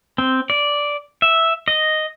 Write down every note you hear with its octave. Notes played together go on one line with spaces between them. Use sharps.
C4
D5
E5
D#5